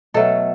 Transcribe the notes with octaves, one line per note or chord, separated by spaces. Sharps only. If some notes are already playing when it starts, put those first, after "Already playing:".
B2 F#3 A3 A4